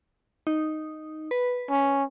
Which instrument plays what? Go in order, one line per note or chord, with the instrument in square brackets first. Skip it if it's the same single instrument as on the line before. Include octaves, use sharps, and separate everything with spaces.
[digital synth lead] D#4
B4
[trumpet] C#4